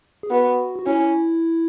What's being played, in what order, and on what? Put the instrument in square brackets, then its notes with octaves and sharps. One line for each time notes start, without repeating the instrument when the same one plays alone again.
[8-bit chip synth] G#4
[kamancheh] B3 [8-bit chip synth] F#4
[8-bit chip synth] F#4
[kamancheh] C#4 [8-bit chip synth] E4